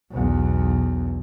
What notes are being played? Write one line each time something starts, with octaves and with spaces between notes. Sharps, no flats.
B1 E2